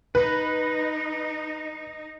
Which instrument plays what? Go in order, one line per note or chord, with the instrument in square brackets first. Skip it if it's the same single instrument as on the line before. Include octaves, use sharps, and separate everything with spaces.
[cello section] D#4 [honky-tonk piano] B4